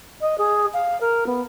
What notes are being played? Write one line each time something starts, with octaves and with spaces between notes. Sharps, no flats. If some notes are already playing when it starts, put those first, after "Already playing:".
D#5
G#4
F5
A#4
B3